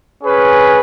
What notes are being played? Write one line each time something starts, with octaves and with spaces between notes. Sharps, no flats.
C#4 G#4 B4